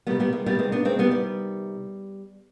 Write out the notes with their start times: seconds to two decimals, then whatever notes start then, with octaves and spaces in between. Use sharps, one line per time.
0.07 C3 D#3 G3 B3
0.20 G3 B3
0.33 G#3
0.46 G3 B3
0.59 G#3 C4
0.72 B3 D4
0.85 G#3 C4
0.99 G3 B3
1.11 G3